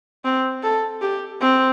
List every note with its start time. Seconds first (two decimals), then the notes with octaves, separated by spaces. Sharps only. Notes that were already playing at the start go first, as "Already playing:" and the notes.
0.25 C4
0.63 A4
1.02 G4
1.41 C4